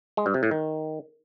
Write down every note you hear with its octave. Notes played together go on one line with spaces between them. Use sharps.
G#3
G2
C3
A2
D#3